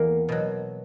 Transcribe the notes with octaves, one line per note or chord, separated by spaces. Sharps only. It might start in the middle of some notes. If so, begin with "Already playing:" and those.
Already playing: E2 A#3
B2 F#3